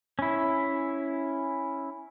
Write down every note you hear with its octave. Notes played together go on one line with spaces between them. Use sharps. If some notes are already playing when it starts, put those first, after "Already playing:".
C#4 E4